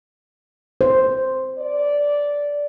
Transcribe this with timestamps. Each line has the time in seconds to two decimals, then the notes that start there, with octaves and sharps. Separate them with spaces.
0.81 C5
1.58 D5